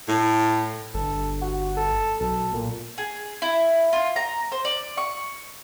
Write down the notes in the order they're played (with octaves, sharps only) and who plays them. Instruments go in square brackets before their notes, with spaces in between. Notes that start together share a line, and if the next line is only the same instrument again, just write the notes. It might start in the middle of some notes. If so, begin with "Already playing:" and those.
[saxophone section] A2
[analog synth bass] G1 [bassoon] A4
[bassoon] F#4
A4
[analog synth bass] B1 [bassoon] A4
[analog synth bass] A#2
[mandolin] G#4
E4
F4
A#5
C5
D5
C#6